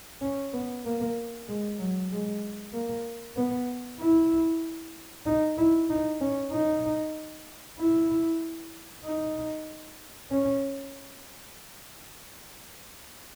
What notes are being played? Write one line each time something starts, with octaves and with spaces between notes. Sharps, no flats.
C#4
B3
A#3
G#3
F#3
G#3
A#3
B3
E4
D#4
E4
D#4
C#4
D#4
E4
D#4
C#4